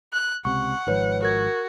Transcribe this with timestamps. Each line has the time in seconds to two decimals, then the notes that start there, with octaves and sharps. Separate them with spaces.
0.13 F#6
0.45 C#2 C3 F#5 C#6
0.87 G#1 G#2 F3 D#4 B4 C#5
1.23 F#4 A#4 G#6